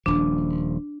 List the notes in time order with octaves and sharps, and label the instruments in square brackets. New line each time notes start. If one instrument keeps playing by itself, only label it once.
[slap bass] D#1 F3 [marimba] D4